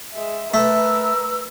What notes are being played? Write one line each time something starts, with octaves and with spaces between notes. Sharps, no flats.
G#3 E5
A3 A#4 B4 E6